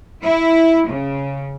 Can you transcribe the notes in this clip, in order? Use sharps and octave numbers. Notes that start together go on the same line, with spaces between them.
E4
C#3